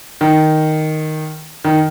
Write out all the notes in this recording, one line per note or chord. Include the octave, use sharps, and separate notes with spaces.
D#3
D#3